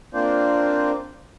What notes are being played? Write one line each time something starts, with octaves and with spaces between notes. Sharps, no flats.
A#3 C4 D4 F4 C5 D5